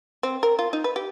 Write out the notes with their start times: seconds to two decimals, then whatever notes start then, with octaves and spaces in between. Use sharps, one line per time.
0.23 C4
0.43 A#4
0.59 F4
0.73 D#4
0.84 B4
0.96 G4